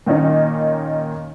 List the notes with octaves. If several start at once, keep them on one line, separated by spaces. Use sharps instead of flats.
A#2 D#3 A#3 C#4 D#4